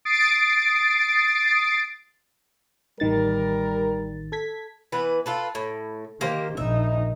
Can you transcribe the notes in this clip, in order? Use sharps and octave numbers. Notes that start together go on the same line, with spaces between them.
D#6 A6 C7 D7
A1 D#3 G3 A#4 A6
A4 G#6 B6
E3 B3 B4
F4 A4 B4
A2
D#3 A#3 G4 C5
A#1 D#4 E5